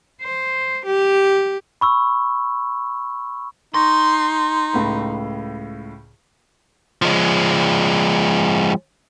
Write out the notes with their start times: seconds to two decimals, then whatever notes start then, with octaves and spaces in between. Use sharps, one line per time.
0.22 C5
0.86 G4
1.81 B5 C#6 E6
3.74 D#4 C6 C#6 A#6
4.73 C#2 A2 B5
7.02 F3 G#3